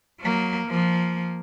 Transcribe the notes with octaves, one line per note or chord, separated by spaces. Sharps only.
F#3 A#3
F3 A#3